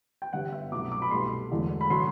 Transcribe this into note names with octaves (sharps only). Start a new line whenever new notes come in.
G5
G1 G2 D3 G3 B3 F#5
E5
C2 B2 F#3 A3 D6
D6
B5
C2 B2 A3 C6
E1 E2 D3 A3
B5
D3 F#3 C6